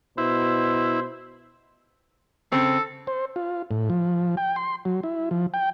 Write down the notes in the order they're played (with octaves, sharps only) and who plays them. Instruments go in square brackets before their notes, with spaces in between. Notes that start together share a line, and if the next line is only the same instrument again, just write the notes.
[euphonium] B2 [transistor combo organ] E4 [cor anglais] C5
[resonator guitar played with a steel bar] C#3 C4 [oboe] A4
[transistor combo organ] C5
F4
A2
F3
G5
C6
F#3
E4
F3
G5